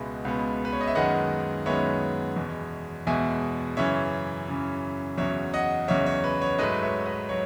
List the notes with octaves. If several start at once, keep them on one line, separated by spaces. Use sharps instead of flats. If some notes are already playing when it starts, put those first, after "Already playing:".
Already playing: C#2 B2 G#3 B3 E5
C#2 B2 G#3 B3
B4
C#5
D#5
E5
F#2 D#3 G#3 B3 D#5 F#5
F#2 D#3 G#3 B3 C#5 E5
E2 B2 G#3
E2 B2 G#3 E5 G#5
F#2 C#3 E3 C#5 E5
F#2 C#3 E3
E2 C#3 F#3 C#5 E5
D#5 F#5
E2 C#3 F#3 C#5 E5
C#5
B4
C#5
G#2 F#3 A3 B4 D#5
C#5 E5
B4 D#5
F#3 C#5